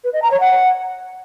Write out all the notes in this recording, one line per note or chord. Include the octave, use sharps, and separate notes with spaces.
B4
D#5
A#5
C#5
F#5